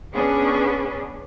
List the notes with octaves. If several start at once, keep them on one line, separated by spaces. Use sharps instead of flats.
B3 C#4 D4 G#4 B4